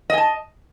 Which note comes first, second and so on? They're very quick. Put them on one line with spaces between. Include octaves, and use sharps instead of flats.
D#5 G#5 A5